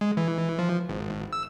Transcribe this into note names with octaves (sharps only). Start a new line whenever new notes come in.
G#3
E3
F3
G#1
E6